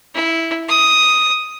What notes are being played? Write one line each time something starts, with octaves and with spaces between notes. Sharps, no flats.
E4
D#6